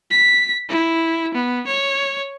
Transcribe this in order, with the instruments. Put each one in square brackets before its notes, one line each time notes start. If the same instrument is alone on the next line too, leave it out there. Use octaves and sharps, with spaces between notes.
[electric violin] B6
E4
B3
C#5